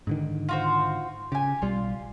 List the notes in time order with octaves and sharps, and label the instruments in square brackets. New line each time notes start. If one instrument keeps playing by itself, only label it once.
[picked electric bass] G#2 D3 D#3
[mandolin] F4 F#4 C5
[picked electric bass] C#3 [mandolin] G4 G#5
[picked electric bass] B1 G3 [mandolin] F4